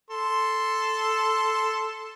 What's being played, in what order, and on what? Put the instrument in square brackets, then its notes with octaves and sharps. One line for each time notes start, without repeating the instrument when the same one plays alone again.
[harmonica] A4 C6